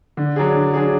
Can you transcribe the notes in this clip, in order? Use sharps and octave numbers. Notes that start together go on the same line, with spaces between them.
D3
F#3 D4 G#4
D3
F#3 D4 G#4